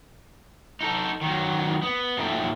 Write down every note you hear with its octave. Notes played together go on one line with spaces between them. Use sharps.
D#4 A4
D#3 F#3
B3
A#2 F#3 D#4 A4 E5 G5